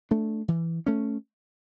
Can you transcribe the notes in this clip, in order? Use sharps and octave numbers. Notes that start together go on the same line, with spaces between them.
A3 D4
E3
A3 C#4